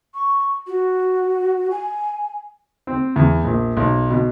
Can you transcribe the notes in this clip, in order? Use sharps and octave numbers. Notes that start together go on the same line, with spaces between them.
C#6
F#4
G#5
C4
E2
A#1
B1
B2